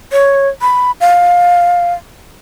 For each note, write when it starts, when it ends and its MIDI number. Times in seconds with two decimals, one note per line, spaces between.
0.12 0.48 73
0.61 0.91 83
1.01 1.93 77